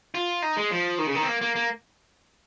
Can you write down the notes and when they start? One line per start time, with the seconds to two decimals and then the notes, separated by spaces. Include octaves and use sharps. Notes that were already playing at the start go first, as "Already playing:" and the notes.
0.14 F4
0.42 D#4
0.57 G#3
0.71 F3
0.98 D#3
1.07 C#3
1.15 D#3
1.22 C4
1.28 A#3
1.41 A#3
1.56 A#3